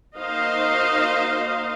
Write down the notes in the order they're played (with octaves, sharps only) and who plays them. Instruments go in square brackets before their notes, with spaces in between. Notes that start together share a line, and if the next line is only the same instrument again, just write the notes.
[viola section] A#3 D#4 F#4 C5 D#5 F5